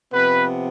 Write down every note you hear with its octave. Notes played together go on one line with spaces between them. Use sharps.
C3 F3 B3 B4